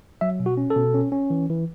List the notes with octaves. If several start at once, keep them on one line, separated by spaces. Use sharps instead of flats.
F#3 E5
B2
F#4
C#4
A4
B2
C#4
C#4
E3
E3